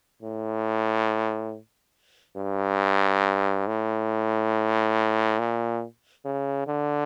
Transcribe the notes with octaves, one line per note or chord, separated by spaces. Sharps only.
A2
G2
A2
A#2
C#3
D3